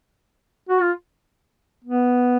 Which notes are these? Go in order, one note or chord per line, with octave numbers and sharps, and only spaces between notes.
F#4
F4
B3